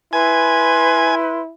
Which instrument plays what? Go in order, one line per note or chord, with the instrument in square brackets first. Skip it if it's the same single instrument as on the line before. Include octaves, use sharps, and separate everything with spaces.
[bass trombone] E4 [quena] B4 [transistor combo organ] G#5 [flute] C6